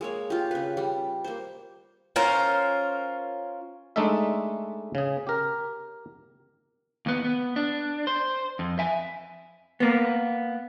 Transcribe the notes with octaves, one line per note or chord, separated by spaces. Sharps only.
G#3 A#3 C#5
F4 G4
C#3 B4
G3
A#3 C5
C#4 F4 A#4 C5
G#3 A3 D4 D#4 A4 E5
C#3 G#4
G4 A#4
D#2 B3
B3
D4
C5
F2
E5 G#5
A#3 B3